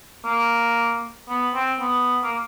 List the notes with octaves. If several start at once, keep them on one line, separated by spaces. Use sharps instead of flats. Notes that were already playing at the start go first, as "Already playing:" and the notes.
A#3
B3
C4
B3
A#3